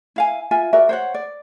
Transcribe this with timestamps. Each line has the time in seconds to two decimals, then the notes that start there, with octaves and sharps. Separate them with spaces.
0.16 E4 F5 G#5
0.51 F4 E5 G#5
0.73 F#4 A#4 D5 E5
0.89 C5 C#5 F#5
1.14 D5